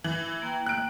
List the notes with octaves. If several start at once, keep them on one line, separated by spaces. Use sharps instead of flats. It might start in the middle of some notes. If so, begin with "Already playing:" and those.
E3
E6
A#3 G5
F#6 D7